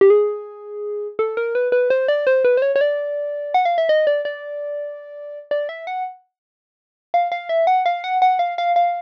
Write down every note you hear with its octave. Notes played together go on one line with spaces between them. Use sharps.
G4
G#4
A4
A#4
B4
B4
C5
D5
C5
B4
C5
C#5
C#5
D5
F#5
F5
E5
D#5
D5
D5
D5
E5
F#5
F5
F5
E5
F#5
F5
F#5
F#5
F5
F5
F5